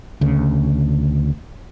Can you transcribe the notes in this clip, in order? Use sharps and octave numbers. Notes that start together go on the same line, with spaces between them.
D2 C#3